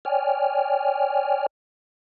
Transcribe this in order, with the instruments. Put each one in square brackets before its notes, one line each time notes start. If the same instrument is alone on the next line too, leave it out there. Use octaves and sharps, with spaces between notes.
[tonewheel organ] C#5 D5 G5 G#5 F6